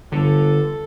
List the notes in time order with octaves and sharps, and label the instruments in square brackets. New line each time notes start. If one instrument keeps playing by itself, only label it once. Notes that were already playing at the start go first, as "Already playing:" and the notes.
[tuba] G1 [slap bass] D3 [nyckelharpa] A4